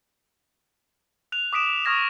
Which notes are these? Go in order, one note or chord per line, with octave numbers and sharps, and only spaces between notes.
F#6 F7
D6 D#6 B6 D7 E7
C#6 D#6 F6 G#6 A#6 F7